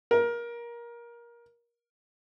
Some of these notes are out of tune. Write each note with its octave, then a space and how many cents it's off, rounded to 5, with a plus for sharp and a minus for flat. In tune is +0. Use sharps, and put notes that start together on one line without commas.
A#4 +20